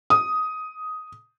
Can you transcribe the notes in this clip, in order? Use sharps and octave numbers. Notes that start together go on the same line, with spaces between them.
D#6